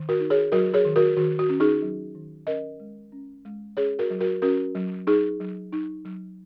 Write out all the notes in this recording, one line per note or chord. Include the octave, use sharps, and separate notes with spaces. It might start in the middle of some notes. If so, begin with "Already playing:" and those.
Already playing: D#3
F#4 A#4
D#4
G#4 C#5
F#3 F#4 A#4
G#4 C#5
D#3
F#4 A#4
D#3 F#4
F#4
C#4
D#4 G#4
F#3
D#3
C#4 A#4 D#5
G#3
C#4
G#3
C#4 G#4 C#5
F#4 A#4
F#3
F#4 A#4
C#4 F#4 A#4
F#3
D#4 G#4
F#3
D#4
F#3